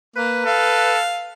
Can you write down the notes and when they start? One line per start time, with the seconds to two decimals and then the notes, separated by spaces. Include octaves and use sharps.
0.16 A#3 B4
0.46 A4 F5